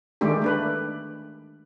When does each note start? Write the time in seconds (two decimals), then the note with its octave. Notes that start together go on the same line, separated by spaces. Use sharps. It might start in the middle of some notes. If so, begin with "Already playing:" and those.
0.21 D3 D#3 G#3 A3 D4 G4
0.42 A3 D4 B4